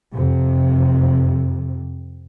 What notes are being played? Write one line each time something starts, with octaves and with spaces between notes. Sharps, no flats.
F2 C3